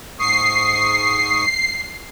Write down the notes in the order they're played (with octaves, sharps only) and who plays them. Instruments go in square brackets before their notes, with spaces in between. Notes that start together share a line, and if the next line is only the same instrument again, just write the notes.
[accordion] G#2 C#6 D#6 [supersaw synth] C7